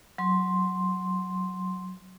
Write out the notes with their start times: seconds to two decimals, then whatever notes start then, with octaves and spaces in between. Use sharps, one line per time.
0.18 F#3 C6